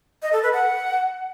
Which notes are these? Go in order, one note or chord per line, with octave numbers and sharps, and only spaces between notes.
D#5
A4
B4
F#5